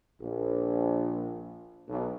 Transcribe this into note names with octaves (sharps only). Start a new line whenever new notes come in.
A#1
B1